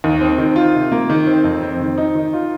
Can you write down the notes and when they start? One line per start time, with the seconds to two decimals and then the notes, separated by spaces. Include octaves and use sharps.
0.04 D#2
0.21 C4
0.38 D#3
0.56 F4
0.75 C3
0.92 A#3
1.10 D#3
1.27 C4
1.44 F2
1.63 C4
1.80 D#3
1.98 D#4
2.15 D#3
2.33 F4